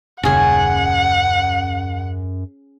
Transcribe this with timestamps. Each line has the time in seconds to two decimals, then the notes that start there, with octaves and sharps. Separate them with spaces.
0.23 D#1 F#2 C#3 C#4 G#4 F#5